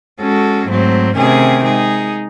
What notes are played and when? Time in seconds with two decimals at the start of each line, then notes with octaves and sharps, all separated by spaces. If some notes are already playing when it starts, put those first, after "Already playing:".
0.21 G#3 C#4 F#4 A4
0.68 G#2 F#3 A3 C4
1.16 C3 D#3 A3 C#4 G#4
1.63 G#3 D#4 G#4